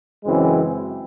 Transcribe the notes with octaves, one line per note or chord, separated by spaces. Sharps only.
F#2 C#3 E3 G#3 C4